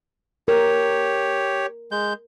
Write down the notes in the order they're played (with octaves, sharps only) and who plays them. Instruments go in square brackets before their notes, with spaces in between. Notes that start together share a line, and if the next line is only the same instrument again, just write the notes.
[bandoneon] G4 C#5 [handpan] A#4
[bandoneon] G#3 G6